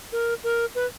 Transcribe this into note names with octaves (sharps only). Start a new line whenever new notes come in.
A#4
A#4
B4